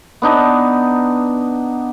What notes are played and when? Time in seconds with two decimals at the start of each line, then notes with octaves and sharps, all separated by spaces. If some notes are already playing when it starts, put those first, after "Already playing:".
0.22 B3 D4 D#4